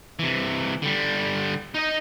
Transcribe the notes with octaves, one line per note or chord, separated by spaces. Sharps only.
C3 E3
D3 G3
D#4 D#5